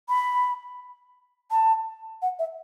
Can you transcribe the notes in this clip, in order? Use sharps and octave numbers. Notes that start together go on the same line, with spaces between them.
B5
A5
F#5
E5